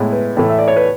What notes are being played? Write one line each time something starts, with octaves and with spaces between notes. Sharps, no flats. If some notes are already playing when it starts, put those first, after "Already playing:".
Already playing: A2 G#3 B3 E4
B4
A2 E3 A3
E5
D5
C#5
B4